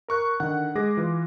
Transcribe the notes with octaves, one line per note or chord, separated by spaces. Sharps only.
A#4 C#6 F#6
D3 D#3 F#5 F#6
G#3 G#4 D6 A#6
E3 F4